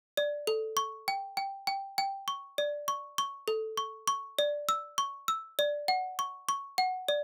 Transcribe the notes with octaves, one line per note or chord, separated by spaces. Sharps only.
D5
A4
C#6
G5
G5
G5
G5
C#6
D5
C#6
C#6
A4
C#6
C#6
D5
E6
C#6
E6
D5
F#5
C#6
C#6
F#5
D5